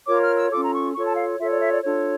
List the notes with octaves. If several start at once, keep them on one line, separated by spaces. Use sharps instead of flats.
F4 A#4 C#5 D6
F6
E6
C#4 F4 A4 D6
A#5
C#6
F4 A4 C#5 C#6
A5
F5
F4 A4 C#5 E5
D5
E5
D5
D4 F4 A4 C#5